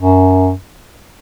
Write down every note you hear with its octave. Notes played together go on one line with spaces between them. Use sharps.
F#2